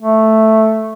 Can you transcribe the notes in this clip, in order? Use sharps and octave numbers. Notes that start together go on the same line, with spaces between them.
A3